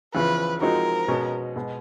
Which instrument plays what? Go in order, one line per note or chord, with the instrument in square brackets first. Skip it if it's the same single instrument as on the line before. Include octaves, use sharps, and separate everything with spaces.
[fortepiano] E2 C#3 F3 [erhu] B4
[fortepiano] F3 G#3 C4 D#4 F#4 [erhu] A#4
[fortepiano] B2 G#3 C#4 F#4
B2 G#3